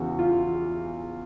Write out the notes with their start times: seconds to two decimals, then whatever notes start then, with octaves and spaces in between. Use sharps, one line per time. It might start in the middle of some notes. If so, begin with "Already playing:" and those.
Already playing: E2 C#3 E3 F#4
0.19 F4